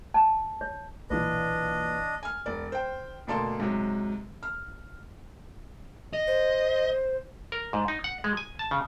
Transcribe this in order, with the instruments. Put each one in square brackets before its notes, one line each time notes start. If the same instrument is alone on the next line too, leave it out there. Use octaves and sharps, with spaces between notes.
[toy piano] A5
C#5
[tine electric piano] B1 B4 [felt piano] A#2 E3 [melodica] D4 D#5
[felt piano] G#5 F6
E1 D5
C5 G5
D2 B2 A#3 A4 D5 C6
G#2 C3 F#3
F6
[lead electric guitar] D#5
[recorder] C5
[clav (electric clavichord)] A#4
G#2
D#4
F#5
G#3
G#5
A5
C#3